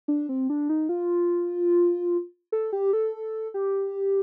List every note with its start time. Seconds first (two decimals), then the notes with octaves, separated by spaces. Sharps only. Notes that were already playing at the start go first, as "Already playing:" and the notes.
0.08 D4
0.29 C4
0.50 D4
0.69 D#4
0.89 F4
2.52 A4
2.73 G4
2.93 A4
3.54 G4